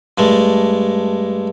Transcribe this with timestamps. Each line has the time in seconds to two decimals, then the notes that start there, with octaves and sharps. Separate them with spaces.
0.18 G2 G#3 A3